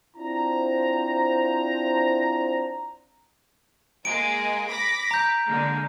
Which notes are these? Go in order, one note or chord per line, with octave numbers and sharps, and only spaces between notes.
C4 D4 E4 F4 C5 A#5
G#3 A#3 G#4 D7
B5 D6 A#6
A#5 G6
D3 G#3 A#3